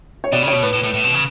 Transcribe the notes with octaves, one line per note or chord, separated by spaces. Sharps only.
C#5
B2 D5
C#3
B2 C#5
A2 B4
A2
A2
A2
B2
C#3